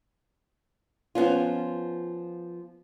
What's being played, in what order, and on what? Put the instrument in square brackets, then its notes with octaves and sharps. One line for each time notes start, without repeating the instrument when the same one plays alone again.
[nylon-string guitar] F3 B3 C#4 F4